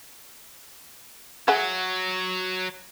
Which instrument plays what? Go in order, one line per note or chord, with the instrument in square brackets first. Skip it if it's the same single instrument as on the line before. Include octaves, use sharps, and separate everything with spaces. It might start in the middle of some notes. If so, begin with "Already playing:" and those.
[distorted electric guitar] F#3 [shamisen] G#4 E5 F#5